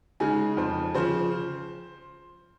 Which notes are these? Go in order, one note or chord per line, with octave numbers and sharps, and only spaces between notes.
C#3 G#3 D#4 G#5
F2 C5
C#3 F3 C5